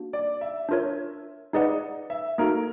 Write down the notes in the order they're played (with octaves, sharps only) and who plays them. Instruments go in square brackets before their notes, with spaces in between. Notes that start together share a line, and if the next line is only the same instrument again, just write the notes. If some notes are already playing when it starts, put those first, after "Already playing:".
Already playing: [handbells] A#3 D4 F#4
[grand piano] D5
E5
[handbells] D4 F4 A#4 C#5
[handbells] D#4 G#4 B4 D5 F#5 [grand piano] D#5
[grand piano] E5
[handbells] A#3 D#4 F#4 A4 [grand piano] A#4